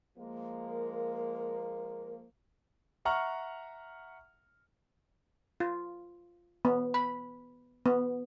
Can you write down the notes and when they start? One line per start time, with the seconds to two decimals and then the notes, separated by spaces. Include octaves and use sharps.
0.18 F3 G#3 A#3
0.66 A#4
3.05 E5 F#5 A#5 C#6 F6
5.60 F4
6.65 B3
6.94 B5
7.86 B3